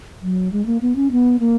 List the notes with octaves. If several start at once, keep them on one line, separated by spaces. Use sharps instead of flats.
F#3
G#3
A#3
B3
C#4
B3
A#3